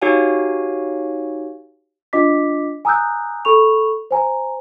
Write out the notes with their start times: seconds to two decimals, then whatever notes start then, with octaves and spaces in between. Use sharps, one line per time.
0.02 D#4 F#4 G4 C#5 F5 G#5
2.13 D4 F4 D#5 D6 B6
2.85 G#5 A#5 D#6 E6 F#6 G6
3.45 A4 B5 C#6 F7
4.11 C5 G#5 A#5